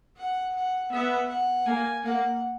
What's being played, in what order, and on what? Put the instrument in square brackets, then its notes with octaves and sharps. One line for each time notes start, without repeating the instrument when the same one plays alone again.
[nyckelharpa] F#5
F#5
[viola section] B3 [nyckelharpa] E5
[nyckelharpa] F#5
[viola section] A#3 [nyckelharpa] G#5
[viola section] A#3 [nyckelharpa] F#5